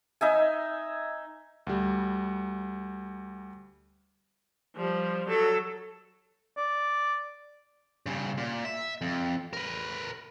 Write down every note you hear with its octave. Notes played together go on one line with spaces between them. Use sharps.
D#4 E5 G#5
D2 G3
F3 G3
F#3 A4
D5
G2 C#3
A#2
E5
F2
A#4 B4